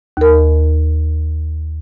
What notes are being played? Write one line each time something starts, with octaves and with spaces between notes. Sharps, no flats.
D#2 A#4